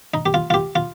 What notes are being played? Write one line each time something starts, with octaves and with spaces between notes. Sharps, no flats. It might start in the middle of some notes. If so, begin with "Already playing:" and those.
D#4
G4
F4
F4
G4
F4